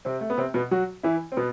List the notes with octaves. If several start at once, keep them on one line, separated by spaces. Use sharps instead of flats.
C3 C4
A3
B3
C3 C4
B2 B3
F#3 F#4
E3 E4
C4
B2 B3